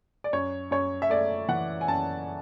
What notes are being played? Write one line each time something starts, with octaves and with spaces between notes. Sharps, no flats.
D5
F#2 C#5
F#2 C#5
E5
A3 D5
E3 F#5
G#5
F#2 A5